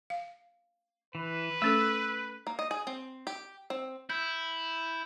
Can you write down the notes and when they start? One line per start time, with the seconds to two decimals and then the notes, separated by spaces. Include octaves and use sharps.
0.10 F5
1.15 E3 B4
1.62 A3 C#4 A4 E6
2.47 A#3
2.59 D#5
2.71 G#4
2.87 C4
3.27 G4
3.70 C4
4.10 E4 G6